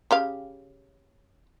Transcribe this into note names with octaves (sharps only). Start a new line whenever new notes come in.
C#3 G4 F5